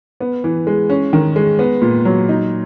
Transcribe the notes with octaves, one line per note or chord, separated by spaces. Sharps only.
B3
E3
G#3
C#4
D#3
G#3
B3
A#2
F#3
D#4